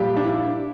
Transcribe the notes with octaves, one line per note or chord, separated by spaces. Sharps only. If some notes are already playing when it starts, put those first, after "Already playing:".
Already playing: A#2 F3 G3 G4
D4
E4